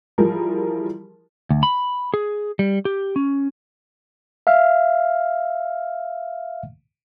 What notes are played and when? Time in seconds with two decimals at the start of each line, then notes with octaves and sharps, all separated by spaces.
0.18 E3 F3 G3 E4 G#4 A#4
1.51 D2
1.63 B5
2.14 G#4
2.59 G3
2.85 G4
3.16 C#4
4.47 E5 F5 F6